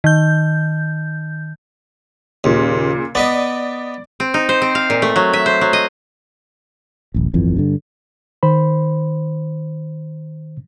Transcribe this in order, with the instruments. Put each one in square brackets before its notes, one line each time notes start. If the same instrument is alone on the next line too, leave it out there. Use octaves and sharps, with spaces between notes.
[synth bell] D#3 G6
[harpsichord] D#2 [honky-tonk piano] A#2 C#3
[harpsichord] B3 B4 D#5 [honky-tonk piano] D5
[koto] C4
D#4
C5
C4
F5
A#2
A3
F#3
E5
C5
F#3
D#5
[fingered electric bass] D#1 A#1
D1 G1 F2 E3
G2 D3
[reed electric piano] D#3 C5 B5